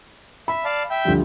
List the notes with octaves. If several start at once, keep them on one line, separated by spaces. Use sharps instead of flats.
E5 B5
D5 F5 A5
E5 G5 G6
D2 F3 G3